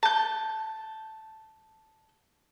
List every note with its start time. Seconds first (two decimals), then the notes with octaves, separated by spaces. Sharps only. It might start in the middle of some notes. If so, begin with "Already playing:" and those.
0.03 A5 G6